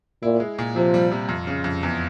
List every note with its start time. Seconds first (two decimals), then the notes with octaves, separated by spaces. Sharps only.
0.23 A#2 E4
0.40 G#3
0.58 A#2
0.76 C3 F3
0.94 G3
1.12 C3
1.29 F2
1.47 C#3
1.64 F2
1.83 E2